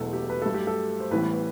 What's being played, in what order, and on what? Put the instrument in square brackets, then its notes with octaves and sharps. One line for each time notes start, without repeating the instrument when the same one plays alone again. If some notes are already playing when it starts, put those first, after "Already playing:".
Already playing: [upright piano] E1 E2 B2 F#3 A3 [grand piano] A4
[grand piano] G4
B4
[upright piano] G2 F#3 A3 [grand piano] A4
[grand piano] G4
A4
C5
[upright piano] A1 A2 E3 G3 B3 [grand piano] B4